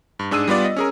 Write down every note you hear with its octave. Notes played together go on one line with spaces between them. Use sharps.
G2
G#2 D4 G#4 E6 D#7
G3 B3 F4 D5
D#5
C#4 G#4 A#4